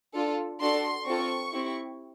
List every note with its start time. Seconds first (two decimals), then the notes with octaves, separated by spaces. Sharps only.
0.14 D4 F4 A4
0.61 D4 F#4 A4 C6
1.06 C4 F4 A4 C#6
1.53 C4 E4 G4